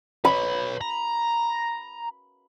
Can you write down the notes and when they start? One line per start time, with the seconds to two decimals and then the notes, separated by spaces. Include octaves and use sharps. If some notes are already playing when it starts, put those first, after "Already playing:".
0.25 B4 C#5 B5
0.81 A#5